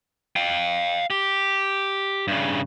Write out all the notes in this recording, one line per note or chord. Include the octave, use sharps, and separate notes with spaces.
F5 G5
G4
G2 C#3